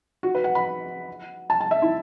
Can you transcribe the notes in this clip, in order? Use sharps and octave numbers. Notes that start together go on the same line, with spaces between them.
F#4
B4
F#5
B5
A5
A5
E5
E4